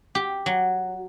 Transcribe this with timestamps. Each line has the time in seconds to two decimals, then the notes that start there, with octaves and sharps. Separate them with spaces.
0.15 G4
0.46 F#3